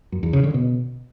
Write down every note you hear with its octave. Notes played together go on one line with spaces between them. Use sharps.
F#2
E2
C#3
D3
B2